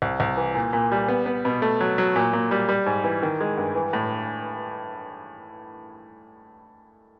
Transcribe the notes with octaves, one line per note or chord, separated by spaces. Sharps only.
C2
C2
E3
A#2
A#2
G3
B3
B3
B2
A3
F#3
F#3
A#2
A#2
G3
G3
G#2
E3
D#3
G#3
G2
E3
A2